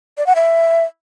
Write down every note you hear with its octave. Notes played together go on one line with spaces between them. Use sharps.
D5
F#5
E5